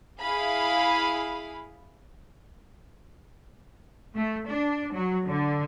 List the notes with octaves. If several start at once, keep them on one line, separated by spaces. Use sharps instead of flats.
E4 G#4 F5 B5
A3
D4
F#3
D3